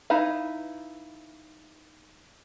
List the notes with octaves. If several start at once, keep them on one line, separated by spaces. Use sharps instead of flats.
D#4 E4 B4 F5